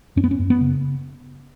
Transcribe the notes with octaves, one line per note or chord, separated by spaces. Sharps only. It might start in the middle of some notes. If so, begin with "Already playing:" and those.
F#2 C#4
B3
C#4
F#2
B3
C#3